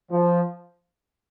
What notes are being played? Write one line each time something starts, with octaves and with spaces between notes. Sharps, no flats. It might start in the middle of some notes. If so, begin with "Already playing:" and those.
F3